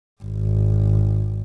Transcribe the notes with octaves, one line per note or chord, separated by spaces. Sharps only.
G#1